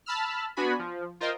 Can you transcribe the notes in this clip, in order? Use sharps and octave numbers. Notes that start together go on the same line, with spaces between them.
A5 B5 E6 F6
B3 D4 F#4 G#5 B5
F3
F4 A#4 C5 D#5 G5